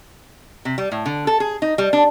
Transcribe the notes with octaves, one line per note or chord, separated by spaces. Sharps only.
C3
G3
A2
D3
A4
G#4
D#4
G3
D4